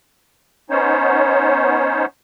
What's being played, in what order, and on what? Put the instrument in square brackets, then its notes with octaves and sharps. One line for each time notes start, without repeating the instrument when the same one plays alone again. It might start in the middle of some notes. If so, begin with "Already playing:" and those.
[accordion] B3 C#4 D#4 C5 C#5